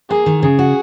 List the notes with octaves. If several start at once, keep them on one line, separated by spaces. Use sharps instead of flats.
A#3 G#4
D#3
C#3 G#4
F#4